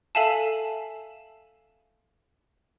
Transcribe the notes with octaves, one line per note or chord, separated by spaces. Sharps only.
A4 E5 F5 G#5 A5